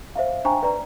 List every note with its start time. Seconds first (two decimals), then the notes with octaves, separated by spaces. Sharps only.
0.16 C5 E5 F5
0.45 D4 C5 G5 G#5 A#5 C#6
0.63 B4 D5 A#5